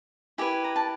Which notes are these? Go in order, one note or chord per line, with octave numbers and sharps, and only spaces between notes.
E4 G4 B4 G#5
A#5
A5